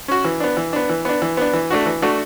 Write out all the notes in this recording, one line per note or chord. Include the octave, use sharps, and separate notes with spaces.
C#4 F#4
E3
B3 D4
E3
B3 D4
E3
B3 D4
E3
B3 D4
E3
A3 D4 F#4
E3
A3 D4 F#4